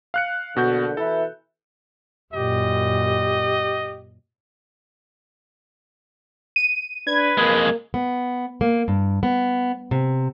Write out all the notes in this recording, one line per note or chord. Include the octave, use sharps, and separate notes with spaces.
F5 F#6 C#7
A#1 B2 D3 F#4 G6
B2 E3 E4 A4
F#2 A#2 G4 D#5
D#7
D4 B4 G#6
F2 G#3 A#3
B3
A#3
G2
B3
C3